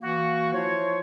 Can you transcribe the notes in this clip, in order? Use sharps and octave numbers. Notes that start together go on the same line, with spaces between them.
E3 A#3 F#4
F3 E4 F4 C5 C#5